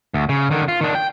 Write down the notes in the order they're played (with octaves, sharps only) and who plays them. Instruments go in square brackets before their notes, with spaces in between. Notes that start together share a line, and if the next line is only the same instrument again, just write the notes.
[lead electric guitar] D2
C#3
D3 D#3
F4
D#3 D4
G5